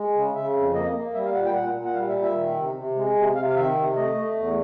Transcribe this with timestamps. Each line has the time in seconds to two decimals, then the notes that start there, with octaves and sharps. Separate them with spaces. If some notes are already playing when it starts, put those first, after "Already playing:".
Already playing: G#3
0.14 C#3
0.35 C#3 E5
0.55 F2
0.74 A#3 D#5
0.94 A#3
1.14 G3 E5
1.25 F5
1.35 A#2 F#5
1.45 G5
1.54 A#2 F#5
1.75 A#2
1.85 F#5
1.94 G3 F5
2.08 E5
2.15 A#2
2.22 E5
2.35 D#3
2.55 C3
2.75 C3
2.95 G#3
3.15 C3
3.35 C3 F5
3.48 F5
3.55 D#3 E5
3.75 C3
3.95 A3 D#5
4.16 A3
4.35 E2